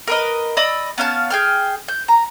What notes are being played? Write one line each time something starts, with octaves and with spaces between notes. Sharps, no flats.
A#4 B4 D#5
D5 D#5 B5 E6
B3 C#4 F5 A5
G#4 G5 F6
G6
A#5